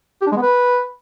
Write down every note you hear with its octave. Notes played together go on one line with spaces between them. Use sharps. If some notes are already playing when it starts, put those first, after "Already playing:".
G4
D4
G#3
B3
B4